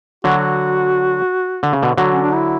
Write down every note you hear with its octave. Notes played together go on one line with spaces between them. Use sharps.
D3 F#3 F#4
D3
C#3
B2 D3
D3 F#3
C#4
D4
E4